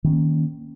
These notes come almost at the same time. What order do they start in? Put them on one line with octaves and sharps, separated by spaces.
D#3 C4 C#4 A#3